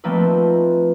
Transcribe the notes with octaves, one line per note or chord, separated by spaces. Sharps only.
F3 A3 A#3 C4 D#4 B4